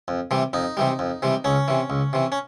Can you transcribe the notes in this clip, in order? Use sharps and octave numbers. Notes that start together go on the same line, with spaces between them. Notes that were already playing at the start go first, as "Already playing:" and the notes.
F2
C3 E3 G3
F2 D#4
C3 E3 G3
F2
C3 E3 G3
C#2 C#4
C3 E3
C#2
C3 E3
C#4